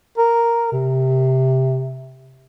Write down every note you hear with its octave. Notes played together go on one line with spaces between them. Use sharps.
A#4
C3